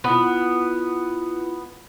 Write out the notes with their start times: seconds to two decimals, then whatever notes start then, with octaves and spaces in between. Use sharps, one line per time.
0.04 B3 E4 F4 B4